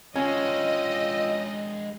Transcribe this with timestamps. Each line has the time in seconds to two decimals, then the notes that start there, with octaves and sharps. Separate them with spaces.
0.16 G#3 C#4 D4 F4 D#5 G5 E6